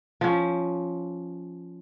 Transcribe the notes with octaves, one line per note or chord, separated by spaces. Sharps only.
F3 C#4